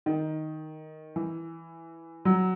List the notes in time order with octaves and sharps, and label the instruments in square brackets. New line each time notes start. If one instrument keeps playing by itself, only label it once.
[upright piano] D#3
E3
F#3